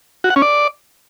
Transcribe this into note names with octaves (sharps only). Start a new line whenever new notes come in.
F#4
F#5
C#4
D5